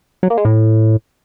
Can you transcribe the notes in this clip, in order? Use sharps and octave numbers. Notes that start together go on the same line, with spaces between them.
F#3
A#3
G#3
A2